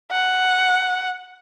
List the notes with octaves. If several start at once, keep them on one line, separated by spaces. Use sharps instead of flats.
F#5